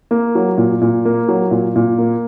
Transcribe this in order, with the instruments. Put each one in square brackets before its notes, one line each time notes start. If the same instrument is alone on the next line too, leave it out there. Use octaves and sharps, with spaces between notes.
[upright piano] A#3
F#3
A#2
A#2
A#3
F#3
A#2
A#2
A#3